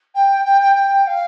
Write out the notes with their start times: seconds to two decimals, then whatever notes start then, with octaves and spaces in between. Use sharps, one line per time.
0.14 G5
0.44 G5
0.60 G5
0.75 G5
1.06 F5